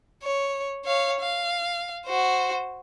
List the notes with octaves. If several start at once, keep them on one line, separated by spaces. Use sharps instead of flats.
C#5
C#5 F5
F5
F#4 C5